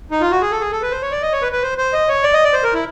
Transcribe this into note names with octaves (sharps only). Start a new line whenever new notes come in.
D#4
F4
F#4
G#4
A4
G#4
A4
B4
C5
C#5
D5
D#5
C#5
B4
B4
C5
C5
D#5
C#5
D5
D#5
D5
C5
A#4
E4